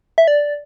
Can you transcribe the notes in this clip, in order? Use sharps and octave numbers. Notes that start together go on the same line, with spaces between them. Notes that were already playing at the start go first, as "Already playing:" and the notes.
E5
D5